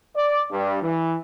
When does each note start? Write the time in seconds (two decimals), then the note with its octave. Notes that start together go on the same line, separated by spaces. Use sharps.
0.16 D5
0.51 G2
0.82 E3